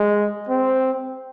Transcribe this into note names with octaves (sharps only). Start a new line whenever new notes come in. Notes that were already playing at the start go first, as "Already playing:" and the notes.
Already playing: G#3
C4